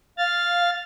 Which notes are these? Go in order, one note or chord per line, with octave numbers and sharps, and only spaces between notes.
F5 F6 A6